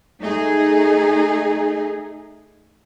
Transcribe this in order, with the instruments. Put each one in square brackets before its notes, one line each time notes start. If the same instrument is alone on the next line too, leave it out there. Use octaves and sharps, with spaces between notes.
[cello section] A3 D#4 G#4